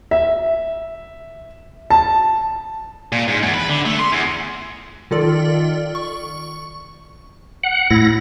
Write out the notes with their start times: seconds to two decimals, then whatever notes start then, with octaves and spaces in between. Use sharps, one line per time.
0.11 E5
1.90 A5
3.12 A#2
3.28 G#2
3.43 E2
3.54 B4
3.69 D3
3.86 A3
3.99 C6
4.12 E2
5.11 D#3 F4 A4 D5
5.95 C#6
7.63 F#5
7.91 A2 E4 A#6